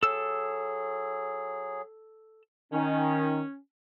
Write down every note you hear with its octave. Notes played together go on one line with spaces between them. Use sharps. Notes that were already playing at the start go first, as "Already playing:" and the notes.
F#3 G#4 A4 E6
D#3 C#4